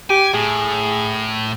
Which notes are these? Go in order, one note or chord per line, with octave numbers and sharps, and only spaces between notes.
G4 G#5
A2 G#4